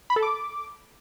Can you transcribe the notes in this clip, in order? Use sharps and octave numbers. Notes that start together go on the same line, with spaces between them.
B5
A4
D6